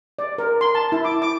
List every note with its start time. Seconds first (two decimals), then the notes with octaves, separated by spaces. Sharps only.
0.19 D5
0.38 A#4
0.61 C6
0.75 A5
0.92 E4
1.05 D6
1.22 D6